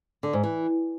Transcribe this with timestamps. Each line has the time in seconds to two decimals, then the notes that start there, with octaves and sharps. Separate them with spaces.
0.23 D3
0.33 G#2
0.43 E3